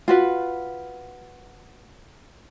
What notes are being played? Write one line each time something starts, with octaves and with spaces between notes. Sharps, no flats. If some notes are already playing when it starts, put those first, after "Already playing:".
F4 F#4 B4